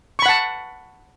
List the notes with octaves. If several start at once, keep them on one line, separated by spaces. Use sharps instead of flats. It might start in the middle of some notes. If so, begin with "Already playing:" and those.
F#5 A5 B5 C#6